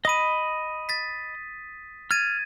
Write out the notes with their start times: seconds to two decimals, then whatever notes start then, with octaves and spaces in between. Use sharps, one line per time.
0.05 D#5 B5 D#6 D#7
0.89 A6 B6
2.11 F6 G#6 A6 D#7